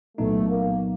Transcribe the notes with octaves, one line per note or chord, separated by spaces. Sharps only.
C2 A#2 F#3 A3 B3 D#4
A#3